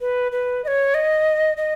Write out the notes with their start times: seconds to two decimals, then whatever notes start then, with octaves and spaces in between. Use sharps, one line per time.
0.01 B4
0.32 B4
0.64 D#5
0.68 C#5
0.94 D#5
1.57 D#5